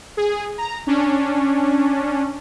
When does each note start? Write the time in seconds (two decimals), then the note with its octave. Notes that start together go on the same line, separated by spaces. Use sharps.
0.17 G#4
0.58 A#5
0.87 C#4 D4